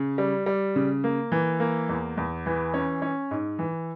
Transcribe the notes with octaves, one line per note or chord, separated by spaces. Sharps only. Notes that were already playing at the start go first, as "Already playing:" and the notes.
Already playing: C#3
G3
G3
C#3
A#3
E3
A#3
E2
E2
E3
C#4
C#4
G#2
E3